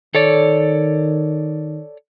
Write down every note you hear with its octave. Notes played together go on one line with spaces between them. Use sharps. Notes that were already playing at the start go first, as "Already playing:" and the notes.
D#3 A4 C#5 D5